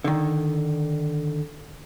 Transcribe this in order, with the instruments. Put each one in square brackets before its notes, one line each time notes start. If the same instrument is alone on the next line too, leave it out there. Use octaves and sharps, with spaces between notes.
[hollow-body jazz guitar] D3 D#3